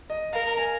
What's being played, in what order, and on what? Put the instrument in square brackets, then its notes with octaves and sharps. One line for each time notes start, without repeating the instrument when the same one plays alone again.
[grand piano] D#5
[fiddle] A#4 [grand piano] F5
[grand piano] A#5
G#5